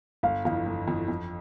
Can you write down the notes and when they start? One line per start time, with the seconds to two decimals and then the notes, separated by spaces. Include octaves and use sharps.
0.23 G1 F5
0.45 F2 E3 F5
0.66 G1
0.88 F2 E3
1.08 F2